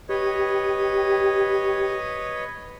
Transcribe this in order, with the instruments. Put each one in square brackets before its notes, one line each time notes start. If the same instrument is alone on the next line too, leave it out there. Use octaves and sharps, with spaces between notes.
[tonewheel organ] G4 [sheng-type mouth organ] B4 C#5 D#5